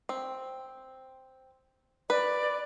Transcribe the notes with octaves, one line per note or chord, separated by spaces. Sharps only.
C4
B4 D5